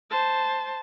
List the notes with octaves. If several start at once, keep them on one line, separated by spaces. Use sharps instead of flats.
C5 A5